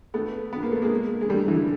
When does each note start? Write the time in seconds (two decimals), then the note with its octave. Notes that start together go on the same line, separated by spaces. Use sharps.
0.14 A3 B3
0.53 B3
0.63 A#3
0.72 A3
0.82 G#3 A#3
1.21 G#3
1.29 G3 A3
1.48 D3 E3